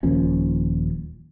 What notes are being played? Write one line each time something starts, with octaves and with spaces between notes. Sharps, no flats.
D#1 D#2 F3 C#4